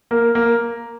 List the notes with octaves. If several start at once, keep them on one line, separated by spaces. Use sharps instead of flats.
A#3
A#3